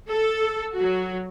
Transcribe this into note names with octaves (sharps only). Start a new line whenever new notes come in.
A4
F#3 F#4